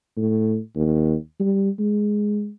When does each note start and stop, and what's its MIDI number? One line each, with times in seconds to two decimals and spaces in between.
0.17 0.58 45
0.76 1.15 39
1.40 1.70 55
1.79 2.50 56